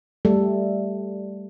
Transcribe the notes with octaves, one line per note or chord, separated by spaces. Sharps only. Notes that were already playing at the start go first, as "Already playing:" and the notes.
G3 A3 A4